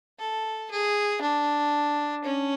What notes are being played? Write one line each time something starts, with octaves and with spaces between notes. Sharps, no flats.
A4
G#4
D4
C#4